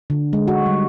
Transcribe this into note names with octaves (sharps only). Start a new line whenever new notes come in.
D3
G#3
F#4
G3